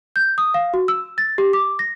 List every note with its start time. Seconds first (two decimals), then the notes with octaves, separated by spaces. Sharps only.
0.16 G6
0.38 D#6
0.54 F5
0.74 F#4
0.88 E6
1.18 A6
1.38 G4
1.53 D6
1.79 A#6